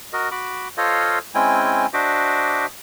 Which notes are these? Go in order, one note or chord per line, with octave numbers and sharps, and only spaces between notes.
F#4 A#4 D#5
F#4 B5 D6
F4 A4 C5 C#5 D#5 F5
G#3 C4 C#4 E4 G5 G#5
D4 F#4 C5 D#5 E5 D6